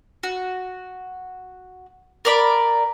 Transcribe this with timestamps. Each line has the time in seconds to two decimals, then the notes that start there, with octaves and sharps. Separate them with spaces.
0.23 F#4
2.25 A#4 D5 B5